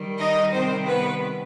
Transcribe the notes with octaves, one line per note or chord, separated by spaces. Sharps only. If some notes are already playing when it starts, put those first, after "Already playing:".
Already playing: D#3 G3
D#4 D#5
C3 D#3 G3 C4 C5
B3 B4